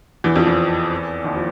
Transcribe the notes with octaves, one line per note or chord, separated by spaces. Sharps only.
E2 E3
F2 F3
E2 E3
D#2 D#3
F3